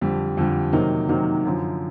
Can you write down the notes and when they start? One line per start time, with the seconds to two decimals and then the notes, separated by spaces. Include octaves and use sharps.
0.01 F2 D3 G3
0.37 F2 D3 G3
0.73 C3 D#3 F#3 A#3 D#4
1.09 C3 D#3 F#3 A#3 D#4
1.45 F#2 D3 F3